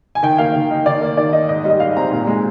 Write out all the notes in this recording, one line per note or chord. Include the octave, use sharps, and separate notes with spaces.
G#5
D#3 G5
A#3 F5
D#3
D#4
D#3 D5
A#3
D#3 D5
D#4 D#5
G#2 D#5
G3 D#5
G#2 F5
C4 A#5
A#2
G#3